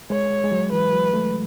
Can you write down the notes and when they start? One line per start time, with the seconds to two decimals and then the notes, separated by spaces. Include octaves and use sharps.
0.10 G#3 C#5
0.30 G#3
0.44 G#3
0.52 F#3
0.72 E3 B4
0.93 F#3
1.14 A3